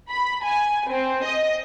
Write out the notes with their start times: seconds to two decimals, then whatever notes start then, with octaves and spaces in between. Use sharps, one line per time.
0.11 B5
0.45 G#5
0.89 C4
1.26 D#5